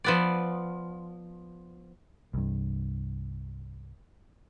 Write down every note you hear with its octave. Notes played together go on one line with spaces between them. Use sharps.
F3 B3 D5
C2 G2